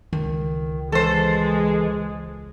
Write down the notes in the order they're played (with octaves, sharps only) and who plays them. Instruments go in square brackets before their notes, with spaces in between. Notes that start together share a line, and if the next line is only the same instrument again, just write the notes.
[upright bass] C#2 [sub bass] D#3
[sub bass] E3 [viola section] G#3 [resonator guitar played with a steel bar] A4 C5